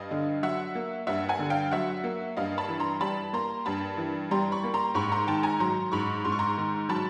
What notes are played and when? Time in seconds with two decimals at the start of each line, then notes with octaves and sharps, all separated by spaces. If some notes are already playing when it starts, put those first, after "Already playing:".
Already playing: G2 D#5 F5
0.11 D3
0.43 F#3 E5 F#5
0.75 A#3
1.07 G2 E5 F#5
1.29 F#5 G#5
1.39 D3
1.50 F5 G5
1.71 F#3 E5 F#5
2.04 A#3
2.37 G2 D#5 F5
2.58 A5 B5
2.68 E3
2.80 A#5 C6
3.01 G3 A5 B5
3.33 A#3 A#5 C6
3.65 G2 A5 B5
3.98 E3
4.31 G3 A#5 C6
4.52 B5 C#6
4.64 A#3
4.74 A#5 C6
4.95 G#2 B5 C#6
5.12 A#5 C6
5.27 D#3 G5 A5
5.43 G#5 A#5
5.60 F#3 A#5 C6
5.92 G#2 B5 C#6
6.24 G#2 C6
6.32 C#6
6.39 A#5 C6
6.57 D#3
6.89 F#3 A5 B5